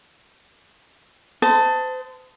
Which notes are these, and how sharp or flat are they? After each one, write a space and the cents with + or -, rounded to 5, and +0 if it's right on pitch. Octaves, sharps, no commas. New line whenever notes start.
C5 -35 A5 +10 D#6 +20